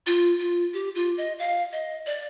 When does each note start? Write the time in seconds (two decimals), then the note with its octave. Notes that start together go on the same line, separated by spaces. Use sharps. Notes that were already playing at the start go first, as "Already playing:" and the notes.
0.07 F4
0.40 F4
0.74 G4
0.95 F4
1.18 D#5
1.39 F5
1.73 D#5
2.06 D5